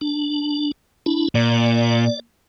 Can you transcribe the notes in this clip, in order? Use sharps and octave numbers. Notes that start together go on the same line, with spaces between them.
D4
D4 E4
A#2 D5